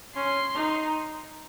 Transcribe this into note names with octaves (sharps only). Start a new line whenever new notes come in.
C#4 C6
D#4